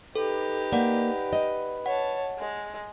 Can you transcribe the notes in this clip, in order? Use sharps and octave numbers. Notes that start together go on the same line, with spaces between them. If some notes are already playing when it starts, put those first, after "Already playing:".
D#4 G4 A4 B4
A#3 D5 F#5
D#5
C#5 F#5 A5
G#3